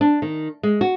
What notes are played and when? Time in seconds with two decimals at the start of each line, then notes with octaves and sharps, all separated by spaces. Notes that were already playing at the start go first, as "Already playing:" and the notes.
0.01 D4
0.22 D#3
0.63 G#3
0.81 F#4